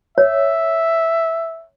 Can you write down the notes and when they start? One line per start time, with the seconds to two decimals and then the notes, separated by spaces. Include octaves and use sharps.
0.18 C#5 E5